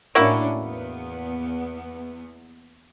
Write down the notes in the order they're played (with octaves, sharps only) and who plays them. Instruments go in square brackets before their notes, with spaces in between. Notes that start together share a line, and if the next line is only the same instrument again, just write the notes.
[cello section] A2 C#4 D4 [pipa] A#3 E4 F#4
[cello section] E2 B3